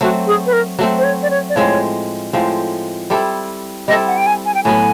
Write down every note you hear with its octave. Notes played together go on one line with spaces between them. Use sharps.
F#3 A3 C4 F#4
G#4
B4
A#4
F#3 A3 C4
C5
C#5
D5
C#5
D5
A2 F3 G#3 C4 C#5
A2 F3 G#3 C4
G3 C4 E4 A4
G3 C4 E4 A4 D#5
F#5
G5
G#5
G#5
G5
A2 F#3 B3 G#5